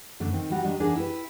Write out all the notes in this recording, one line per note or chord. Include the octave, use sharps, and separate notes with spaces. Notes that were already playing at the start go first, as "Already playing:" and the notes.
F#2 D3 A3
D#3 C4
G3 F#4 F#5
D#3 G3 D4 D#5
E2 D4 G#4 A#4 F#5
E4 G4 B4